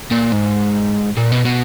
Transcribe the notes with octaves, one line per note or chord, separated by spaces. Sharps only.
A#2
G#2
A#2
B2
B2